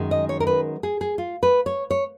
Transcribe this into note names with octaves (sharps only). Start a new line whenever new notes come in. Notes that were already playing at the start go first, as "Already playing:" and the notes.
Already playing: F#2 D#3 G#3
D#5
C#5
A#4
B4
G#4
G#4
F4
B4
C#5
C#5